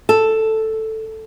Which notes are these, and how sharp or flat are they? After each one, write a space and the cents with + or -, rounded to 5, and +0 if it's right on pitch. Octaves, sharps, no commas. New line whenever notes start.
A4 +5